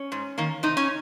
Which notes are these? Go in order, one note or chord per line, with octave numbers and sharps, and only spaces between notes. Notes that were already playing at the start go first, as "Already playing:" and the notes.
Already playing: C#4
G#2
D#3 A#3
C3 D#4
C#4